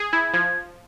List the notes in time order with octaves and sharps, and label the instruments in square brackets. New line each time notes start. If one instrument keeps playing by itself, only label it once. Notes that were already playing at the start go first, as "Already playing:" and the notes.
Already playing: [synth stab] G#4
[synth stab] E4 [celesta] G#6
[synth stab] F3 [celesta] G#6